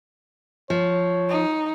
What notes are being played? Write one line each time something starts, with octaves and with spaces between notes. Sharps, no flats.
F3 C#5
D#4